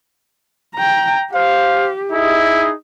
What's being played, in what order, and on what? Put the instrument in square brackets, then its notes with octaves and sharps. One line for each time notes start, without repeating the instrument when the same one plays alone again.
[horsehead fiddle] G5 A#5
[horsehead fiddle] G4 [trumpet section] C5 F5
[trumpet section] D#4 G#4 D#5 [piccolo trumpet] E4